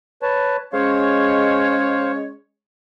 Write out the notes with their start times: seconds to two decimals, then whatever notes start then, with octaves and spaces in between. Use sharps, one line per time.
0.22 B4 C#5 A5
0.73 G#3 C#4 C5 C#5 F5